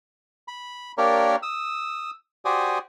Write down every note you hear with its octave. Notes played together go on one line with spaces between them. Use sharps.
B5
A#3 D4 G4 A#4 C#5 D5
D#6 E6
F#4 G4 C5 D5 G#5 D#6